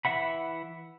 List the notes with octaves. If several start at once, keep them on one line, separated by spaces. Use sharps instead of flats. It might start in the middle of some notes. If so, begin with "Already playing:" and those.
E3 E5 F#5 B5